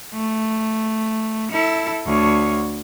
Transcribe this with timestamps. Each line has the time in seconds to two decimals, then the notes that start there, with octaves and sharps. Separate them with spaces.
0.13 A3
1.52 E4 A4
2.06 D2 C#5